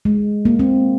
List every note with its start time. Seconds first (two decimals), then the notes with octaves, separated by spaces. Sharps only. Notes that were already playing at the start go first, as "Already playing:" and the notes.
0.05 G#3
0.45 A#3
0.59 C4